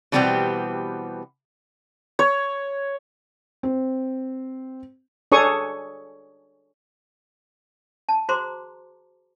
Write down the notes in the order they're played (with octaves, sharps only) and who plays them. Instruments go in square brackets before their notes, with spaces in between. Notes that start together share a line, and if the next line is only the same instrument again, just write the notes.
[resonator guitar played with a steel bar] B2 E3 G3 B3 C4 G4
[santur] C#5
[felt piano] C4
[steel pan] D4 G#4 A4 C#5 C#6 D#6
[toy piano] A5
F#4 G#4 C5 A#5 C6 D6